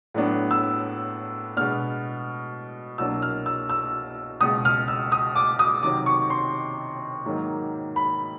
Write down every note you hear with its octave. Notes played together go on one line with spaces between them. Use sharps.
A2 F#3 B3 D4
E6
B2 G#3 B3 D4 F6
C2 B2 F#3 A#3 D4 E6
F6
E6
E6
C#2 B2 G#3 D#6
F6
E6
D#6
D6
D#6
C3 D#3 F#3 D6
C#6
C6
G#2 D#3 F#3 A#3
B5